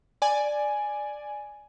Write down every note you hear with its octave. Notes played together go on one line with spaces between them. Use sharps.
D5 G#5